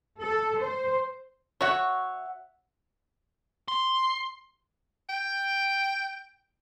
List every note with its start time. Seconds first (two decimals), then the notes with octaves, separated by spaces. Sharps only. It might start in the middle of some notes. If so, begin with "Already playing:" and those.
0.21 A4
0.59 C5
1.61 F#4 C#5 E5 F#5
3.68 C6
5.09 G5